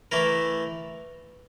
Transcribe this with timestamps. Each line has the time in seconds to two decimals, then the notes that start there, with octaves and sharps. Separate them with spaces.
0.12 E3 A3 E4 A#4